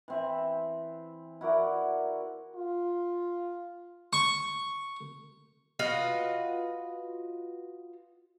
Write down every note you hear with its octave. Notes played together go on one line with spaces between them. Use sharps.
E3 C4 E5
E4 F#4 A#4 D5
F4
C#6
F4 F#4 B4 D#5